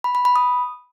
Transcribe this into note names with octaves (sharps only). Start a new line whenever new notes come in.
B5
B5
B5
D#6